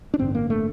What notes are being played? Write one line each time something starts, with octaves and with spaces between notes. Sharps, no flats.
D4
A1 G2 D3 C4
A#3
A3